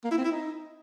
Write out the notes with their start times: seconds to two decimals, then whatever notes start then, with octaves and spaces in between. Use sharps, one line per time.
0.04 A#3
0.11 E4
0.18 C4
0.24 E4
0.31 D#4